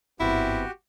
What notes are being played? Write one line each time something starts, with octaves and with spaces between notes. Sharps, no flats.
G1 G#2 E3 B3 C4 E4 F#4 G4